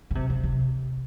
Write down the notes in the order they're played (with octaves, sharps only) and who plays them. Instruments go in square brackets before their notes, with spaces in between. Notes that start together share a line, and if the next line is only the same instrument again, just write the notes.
[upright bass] C#3
C3
C#3
C3